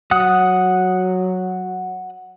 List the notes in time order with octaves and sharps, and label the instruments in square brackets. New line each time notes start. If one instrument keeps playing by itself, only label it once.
[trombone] F#3 [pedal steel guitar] F#5 D#6 F#6